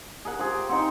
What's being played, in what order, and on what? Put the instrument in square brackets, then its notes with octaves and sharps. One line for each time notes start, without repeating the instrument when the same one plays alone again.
[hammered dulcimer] G#4 A#4 F#5
[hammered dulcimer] F4 G4 G#4 [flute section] C5
[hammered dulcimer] G5 G#5
[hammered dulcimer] C4 D#4 [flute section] F#5 C6